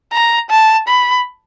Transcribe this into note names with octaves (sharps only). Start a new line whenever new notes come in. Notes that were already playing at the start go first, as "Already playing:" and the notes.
A#5
A5
B5